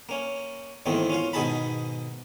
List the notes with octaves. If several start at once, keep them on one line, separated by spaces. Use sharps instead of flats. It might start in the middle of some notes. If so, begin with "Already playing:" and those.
A#3 C#4
E2 G#2 D#3 A3 A#3 C4
C#4 F4 F5
G#2 B2 D#3 G#4 A5 B5